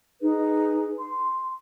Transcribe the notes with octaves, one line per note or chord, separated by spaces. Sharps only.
D#4 G#4 B4
C6